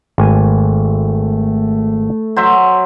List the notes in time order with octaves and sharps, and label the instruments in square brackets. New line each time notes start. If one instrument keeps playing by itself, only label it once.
[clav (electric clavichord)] G#1 G#5 [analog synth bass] A3
[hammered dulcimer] F#3 C5 E5